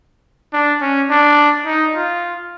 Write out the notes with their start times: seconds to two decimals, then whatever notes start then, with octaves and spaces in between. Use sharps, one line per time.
0.53 D4
0.81 C#4
1.10 D4
1.66 D#4
1.95 F4